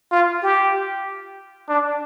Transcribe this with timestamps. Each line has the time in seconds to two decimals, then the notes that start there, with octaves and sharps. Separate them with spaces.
0.12 F4
0.42 G4
1.69 D4